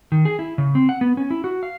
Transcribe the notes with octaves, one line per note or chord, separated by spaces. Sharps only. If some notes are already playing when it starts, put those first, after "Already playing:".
D#3
G#4
E4
C#3
C4
F#5
B3
C#4
E4
F#4
F5